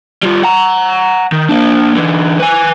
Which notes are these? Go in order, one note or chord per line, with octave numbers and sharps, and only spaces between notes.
G3 F4
F#5 A#5
D#3
A#3 D4
D3 E3
B4 G#5